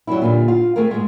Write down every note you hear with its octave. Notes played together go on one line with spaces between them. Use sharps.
F#3 G3 C4 C#4 E4
A#2 D3 G3
F4
A3 C4 G#4 A#4
G#2 G#3